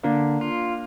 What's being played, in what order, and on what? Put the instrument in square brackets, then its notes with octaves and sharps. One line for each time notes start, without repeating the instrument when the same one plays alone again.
[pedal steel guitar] D3 [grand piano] A#3 D4
[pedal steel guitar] F4